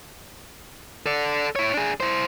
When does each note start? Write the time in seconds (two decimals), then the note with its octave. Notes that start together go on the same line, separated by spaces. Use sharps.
1.06 A4 D5
1.56 E4 C#5
1.74 D4 G#4
2.00 E4 C5